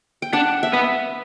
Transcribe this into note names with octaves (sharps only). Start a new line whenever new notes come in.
G5
D4 F#5
E5
B3